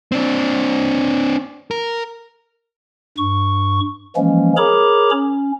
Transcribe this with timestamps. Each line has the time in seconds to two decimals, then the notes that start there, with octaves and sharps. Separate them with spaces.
0.12 C4 D4
1.71 A#4
3.18 G2 C#6
4.16 E3 F3 G#3 A#3 C#4
4.57 G#4 A#4 C#5 A#5 B5 D6
5.11 C#4